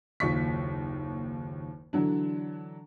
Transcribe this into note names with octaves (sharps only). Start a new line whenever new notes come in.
F#1 D#2 F4 C#6 B6
D3 E3 F#3 D4